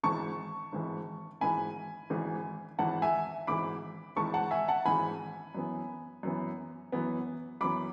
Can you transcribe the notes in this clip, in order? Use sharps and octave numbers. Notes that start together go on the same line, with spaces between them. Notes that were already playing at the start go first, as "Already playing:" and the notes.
G#1 G#2 E3 A5 C#6
G#1 G#2 E3
G#1 G#2 E3 G#5 B5
G#1 G#2 E3
G#1 G#2 E3 F#5 A5
E5 G#5
G#1 G#2 E3 B5 D6
G#1 G#2 E3 A5 C#6
F#5 A5
E5 G#5
F#5 A5
G#1 G#2 E3 G#5 B5
F#2 E3 B3
F#2 E3 B3
F#2 E3 B3
F#2 E3 B3 B5 D6